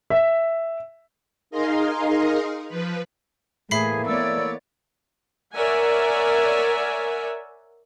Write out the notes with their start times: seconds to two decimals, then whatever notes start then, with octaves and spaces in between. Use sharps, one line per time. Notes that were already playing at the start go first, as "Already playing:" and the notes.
0.10 E5
1.51 D#4 G#4 A#4 D#5 F5 C6
2.68 F3 B4
3.71 A2 E3 A3 A#3 G#4 E5 B5 C7
4.06 B3 C#5 D5 E6
5.56 A#4 C#5 D5 E5 F#5 G#5